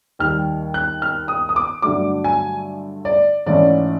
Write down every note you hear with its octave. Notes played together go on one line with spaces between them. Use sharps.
D#2 D#3 G3 F6
F#6
F6
D#6
D#6
D6
G2 D3 F#3 A3 D4 D6
G#5
D5
G#2 E3 A3 C#4 D5